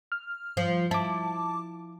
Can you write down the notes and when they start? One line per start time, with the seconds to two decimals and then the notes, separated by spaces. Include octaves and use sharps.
0.12 F6
0.57 F3
0.91 E4 A5 D6